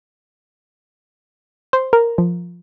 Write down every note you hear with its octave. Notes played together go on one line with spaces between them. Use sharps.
C5
A#4
F3